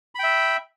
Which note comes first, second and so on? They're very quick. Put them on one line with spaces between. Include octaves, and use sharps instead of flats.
B5 G5 E5